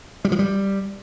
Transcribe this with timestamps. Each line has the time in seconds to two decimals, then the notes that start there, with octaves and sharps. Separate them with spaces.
0.25 G3
0.32 F3
0.39 G3